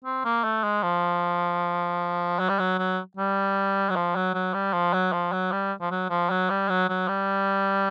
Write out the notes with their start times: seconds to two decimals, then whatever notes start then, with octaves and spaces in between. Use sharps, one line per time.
0.05 C4
0.25 A#3
0.44 A3
0.64 G#3
0.83 F3
2.39 F#3
2.49 G3
2.59 F#3
2.79 F#3
3.17 G3
3.90 F#3
3.96 F3
4.16 F#3
4.34 F#3
4.54 G3
4.73 F3
4.94 F#3
5.13 F3
5.33 F#3
5.52 G3
5.81 F3
5.91 F#3
6.10 F3
6.31 F#3
6.50 G3
6.69 F#3
6.89 F#3
7.08 G3